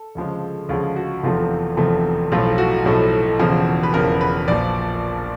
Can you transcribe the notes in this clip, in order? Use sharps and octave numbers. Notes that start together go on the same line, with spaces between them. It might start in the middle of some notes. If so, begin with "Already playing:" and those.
Already playing: A4
D2 C#3 F3 G#3
D2 C#3 F3 G#3 F4
F#4
F1 E2 C3 F3 A3 F4
F1 E2 C3 F3 A3
B1 A2 F3 A3 F4
F#4
B1 A2 F3 A3
E1 E2 C#3 F3
B4
E1 E2 C#3 F3 A#4
B4
A#1 A#2 F3 D5